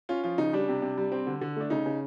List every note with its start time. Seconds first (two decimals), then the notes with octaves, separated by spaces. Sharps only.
0.09 C#4 F4
0.24 F3 F4
0.38 C#3 D#4
0.53 G3 D4
0.68 C3
0.82 C3
0.97 G3
1.12 C4
1.27 D3
1.41 D3
1.56 A3 D4
1.70 C#3 D#4
1.86 C#3